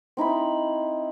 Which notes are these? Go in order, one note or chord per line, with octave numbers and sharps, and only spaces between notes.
C4 D#4 E4 B5